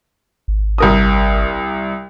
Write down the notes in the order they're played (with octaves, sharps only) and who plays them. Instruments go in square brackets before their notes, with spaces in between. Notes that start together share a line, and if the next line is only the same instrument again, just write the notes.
[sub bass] G#1
[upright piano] C2 A#4 D#6